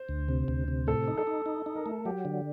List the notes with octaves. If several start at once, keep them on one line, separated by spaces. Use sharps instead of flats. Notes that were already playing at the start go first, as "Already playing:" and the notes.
Already playing: C5
D2
C3
D2
C3
A2 A4
D#4
A4
D#4
D#4
D#4
A#4
A3
F#3 G4
D3